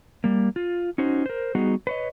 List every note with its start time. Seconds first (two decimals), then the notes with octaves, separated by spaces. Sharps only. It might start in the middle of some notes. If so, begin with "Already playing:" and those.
0.24 G3 A#3
0.56 F4
0.98 C#4 D#4 F#4 C5
1.26 A#4 C5
1.55 G3 B3 D#4 F#4 G#4
1.87 B4 C#5 D#5